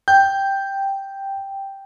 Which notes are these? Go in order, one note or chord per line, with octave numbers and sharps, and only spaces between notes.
G5 G6